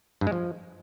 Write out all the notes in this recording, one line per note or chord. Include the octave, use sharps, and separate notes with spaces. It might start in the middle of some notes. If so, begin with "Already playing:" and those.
G2
G#3
F3